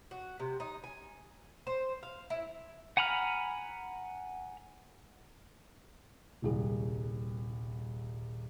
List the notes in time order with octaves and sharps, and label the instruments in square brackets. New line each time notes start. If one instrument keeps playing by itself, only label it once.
[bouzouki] F#4
C3
D#4
G#5
C5
F5
E4
[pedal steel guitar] F#5 G#5 A#5 B5 F6
[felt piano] D#1 C2 G#4